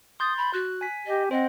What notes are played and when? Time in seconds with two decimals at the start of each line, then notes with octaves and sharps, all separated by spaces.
0.20 C6 D#6 G6 A6
0.37 B5
0.54 F#4 F#6
0.81 G#5 B6
1.06 G4 D#5
1.31 C4 C5 D#5 F#5